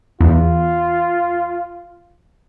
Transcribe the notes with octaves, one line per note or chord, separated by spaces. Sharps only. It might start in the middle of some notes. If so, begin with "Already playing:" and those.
E2 F4